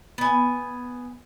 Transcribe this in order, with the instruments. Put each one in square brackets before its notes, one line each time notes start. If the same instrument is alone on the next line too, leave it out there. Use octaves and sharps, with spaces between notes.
[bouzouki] B3 G#5